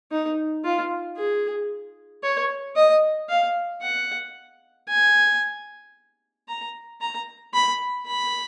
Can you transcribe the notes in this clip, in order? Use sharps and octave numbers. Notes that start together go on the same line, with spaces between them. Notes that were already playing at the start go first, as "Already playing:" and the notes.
D#4
F4
G#4
C#5
D#5
F5
F#5
G#5
A#5
A#5
B5
B5